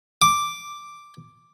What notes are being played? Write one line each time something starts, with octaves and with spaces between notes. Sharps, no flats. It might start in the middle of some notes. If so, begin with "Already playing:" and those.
D6